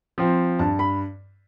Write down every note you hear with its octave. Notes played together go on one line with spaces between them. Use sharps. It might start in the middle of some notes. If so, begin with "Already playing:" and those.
F3 C4
G2 A5
B5